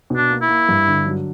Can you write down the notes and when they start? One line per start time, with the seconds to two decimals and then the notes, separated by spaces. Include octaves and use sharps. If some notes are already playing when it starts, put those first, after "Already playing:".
0.10 B2
0.16 D4
0.30 A#3
0.42 E4
0.48 A#3
0.69 G2
0.88 D3
1.06 F#3